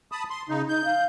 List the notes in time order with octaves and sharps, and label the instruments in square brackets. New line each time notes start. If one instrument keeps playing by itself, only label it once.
[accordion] A5 B5 D#6
C6
C#3 D#4
[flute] D#4 [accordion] G6
[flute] F5